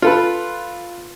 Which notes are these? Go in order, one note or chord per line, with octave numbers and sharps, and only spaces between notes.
F4 A4 B4